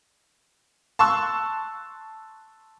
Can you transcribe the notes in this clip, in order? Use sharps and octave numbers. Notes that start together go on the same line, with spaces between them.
A5 C6 C#6 E6 F#6